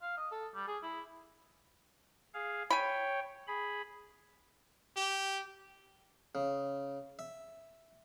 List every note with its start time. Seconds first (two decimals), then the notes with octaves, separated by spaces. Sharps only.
0.02 F5
0.17 D#5
0.31 A4
0.55 G3
0.68 G#4
0.83 E4
2.34 G#4 F5
2.70 C#5 G5 G#5 B5
3.47 G#4 B5
4.96 G4
6.35 C#3
7.19 E5